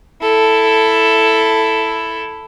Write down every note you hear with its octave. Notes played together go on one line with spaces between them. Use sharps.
E4 A4